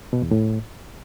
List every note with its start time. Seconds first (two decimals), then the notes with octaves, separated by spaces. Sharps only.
0.13 B2
0.22 E2
0.31 A2